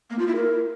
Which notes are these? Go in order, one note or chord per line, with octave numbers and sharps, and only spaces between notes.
A#3
F4
E4
A#4